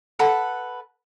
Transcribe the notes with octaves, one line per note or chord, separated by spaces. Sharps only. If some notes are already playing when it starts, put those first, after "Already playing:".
A4 B4 F#5 B5